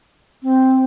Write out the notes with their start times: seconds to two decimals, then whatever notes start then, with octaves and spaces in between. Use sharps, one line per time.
0.43 C4